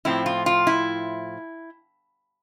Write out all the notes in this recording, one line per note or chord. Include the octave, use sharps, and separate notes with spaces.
A2 F3 C4 E4
F4
F4
E4